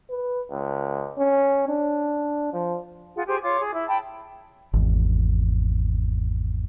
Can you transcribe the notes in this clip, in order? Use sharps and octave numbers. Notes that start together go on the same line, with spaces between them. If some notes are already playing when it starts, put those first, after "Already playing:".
B4
C#2
C#4
D4
F3
F4 G#4 F#5
G4 G#4 C5
F4 C#5 C6 D6
G#4
E4
G5 A5 B5
G#1 E2